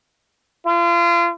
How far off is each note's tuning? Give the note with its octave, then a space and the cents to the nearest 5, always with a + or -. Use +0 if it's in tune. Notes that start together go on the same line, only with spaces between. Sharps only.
F4 -35